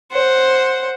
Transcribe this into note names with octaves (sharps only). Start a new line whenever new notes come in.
C5 F#5